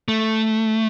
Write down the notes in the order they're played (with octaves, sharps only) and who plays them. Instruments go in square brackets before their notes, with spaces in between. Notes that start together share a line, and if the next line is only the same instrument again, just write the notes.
[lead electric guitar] A3